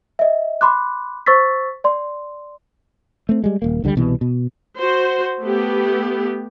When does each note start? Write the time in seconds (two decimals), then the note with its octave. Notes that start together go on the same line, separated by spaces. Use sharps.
0.19 D#5 E5
0.61 B5 C6 D6 F#6
1.26 C5 C#6 E6 A6 B6
1.84 D5 C6
3.29 A3 C4
3.44 G3 G#3
3.62 D#1 A#3
3.84 C#2 D3 F#3 G3
3.95 C2 B2 E3 G3
4.21 B2
4.77 F#4 C5
5.41 A3 B3 G4